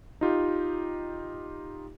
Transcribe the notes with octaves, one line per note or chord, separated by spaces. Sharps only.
D#4 F4 G4